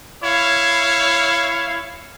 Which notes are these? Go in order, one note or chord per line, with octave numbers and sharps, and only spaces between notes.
E4 C#5 F5